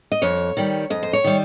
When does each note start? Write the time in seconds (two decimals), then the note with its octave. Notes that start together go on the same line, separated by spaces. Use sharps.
0.12 D#5
0.22 F2 C#5
0.57 D#3 G3
0.90 F2 D#5
1.03 C5
1.13 C#5
1.24 D#3 G3